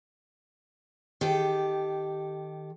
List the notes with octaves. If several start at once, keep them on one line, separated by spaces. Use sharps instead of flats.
D#3 G4 A4